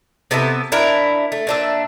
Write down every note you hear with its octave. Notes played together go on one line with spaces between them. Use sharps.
C3 B3 E4 A4
D4 E4 A#4
A3
A#2 D4 E5